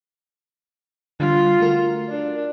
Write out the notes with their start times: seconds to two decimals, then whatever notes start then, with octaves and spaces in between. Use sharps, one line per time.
1.20 D3 G3 F4
1.60 A3 F#4 A#4
2.09 D4